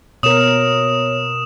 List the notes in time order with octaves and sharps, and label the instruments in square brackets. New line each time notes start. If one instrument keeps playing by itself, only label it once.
[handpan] B2 A#4 [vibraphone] C#5 [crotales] D#6 E7